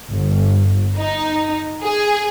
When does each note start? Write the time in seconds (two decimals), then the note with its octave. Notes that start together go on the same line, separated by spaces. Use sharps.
0.11 G1
0.98 D#4
1.83 G#4